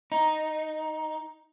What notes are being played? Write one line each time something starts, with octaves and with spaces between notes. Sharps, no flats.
D#4